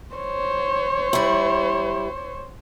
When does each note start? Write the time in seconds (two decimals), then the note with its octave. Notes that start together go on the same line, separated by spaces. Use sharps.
0.14 C5 C#5
1.13 G3 E4